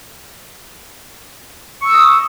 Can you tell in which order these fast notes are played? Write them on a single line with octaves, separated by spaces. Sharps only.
C#6 E6 D#6